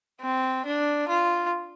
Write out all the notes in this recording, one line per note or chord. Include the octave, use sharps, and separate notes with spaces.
C4
D4
F4